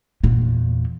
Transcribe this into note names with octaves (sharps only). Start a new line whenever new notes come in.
E2 A#2